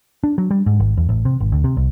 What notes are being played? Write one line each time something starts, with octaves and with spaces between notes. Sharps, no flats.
D4
F#3
G3
G#2
G#1
E2
A1
C3
G#1
D2
C3
C2